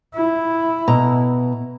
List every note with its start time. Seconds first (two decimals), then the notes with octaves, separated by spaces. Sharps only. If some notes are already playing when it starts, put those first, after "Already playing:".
0.15 E4
0.88 B2 A#5